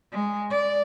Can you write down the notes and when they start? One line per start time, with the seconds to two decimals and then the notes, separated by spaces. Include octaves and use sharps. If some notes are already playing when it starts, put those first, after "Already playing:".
0.12 G#3
0.50 D5